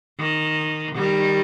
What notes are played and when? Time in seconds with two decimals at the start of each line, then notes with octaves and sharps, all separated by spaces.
0.20 D#3
0.96 D#3 G3